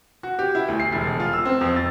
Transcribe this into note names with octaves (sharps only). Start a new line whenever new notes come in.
F#4
G4
E4
D2
C7
E1
E1
F4
E6
C4
F2
A6